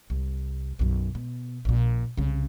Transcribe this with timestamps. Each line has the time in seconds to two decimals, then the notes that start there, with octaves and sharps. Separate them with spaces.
0.10 C2
0.79 B1 F#2
1.15 B2
1.65 A#1 A#2
2.17 C2 C#3